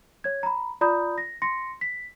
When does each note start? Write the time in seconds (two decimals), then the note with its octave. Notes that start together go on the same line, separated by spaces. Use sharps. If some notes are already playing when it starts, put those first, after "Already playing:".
0.24 C#5 G#6
0.43 A#5 B5
0.81 F4 D5 A#5 B5 D#6 G6
1.18 A#6
1.42 C6 A#6 C#7
1.81 B6